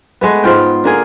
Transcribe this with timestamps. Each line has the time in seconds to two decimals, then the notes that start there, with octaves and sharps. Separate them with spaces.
0.21 G#3 A3 B3
0.44 G#2 F4 G5
0.84 D3 A#3 G#4